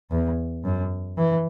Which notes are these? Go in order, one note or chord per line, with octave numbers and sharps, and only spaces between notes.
E2
F#2
E3